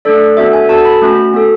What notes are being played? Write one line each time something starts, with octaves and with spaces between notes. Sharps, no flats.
A3 D4 A4 D5
B3 D4 F#4 A4 E5
G#5
B3 F#4 A4 A5
B5
A3 C#4 F#4
B3 F#4 A4